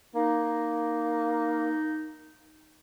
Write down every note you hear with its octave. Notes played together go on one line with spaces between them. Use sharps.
A#3 D#4